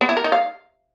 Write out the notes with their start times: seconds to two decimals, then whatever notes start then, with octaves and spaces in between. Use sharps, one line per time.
0.01 B3
0.09 E4
0.17 A#4
0.24 D#4
0.32 F5